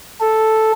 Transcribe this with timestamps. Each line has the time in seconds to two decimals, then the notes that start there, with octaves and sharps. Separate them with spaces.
0.21 A4